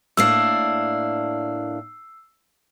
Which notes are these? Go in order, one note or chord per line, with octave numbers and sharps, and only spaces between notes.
A2 A#3 D4 E6 C7